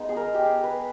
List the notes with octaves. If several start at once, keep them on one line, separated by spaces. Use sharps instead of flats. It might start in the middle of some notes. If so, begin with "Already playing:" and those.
Already playing: G#3 B3 D#4
G#4
A#4
G4
G#4
B4